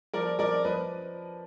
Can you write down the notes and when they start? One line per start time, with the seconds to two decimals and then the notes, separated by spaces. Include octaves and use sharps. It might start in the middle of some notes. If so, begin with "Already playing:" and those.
0.14 F3 A#4 D5
0.39 F3 A#4 D5
0.65 F3 B4 D#5